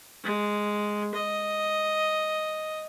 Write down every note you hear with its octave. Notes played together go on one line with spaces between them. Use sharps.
G#3
D#5